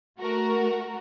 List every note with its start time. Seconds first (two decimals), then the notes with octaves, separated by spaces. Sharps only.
0.20 A3 F#4 A#4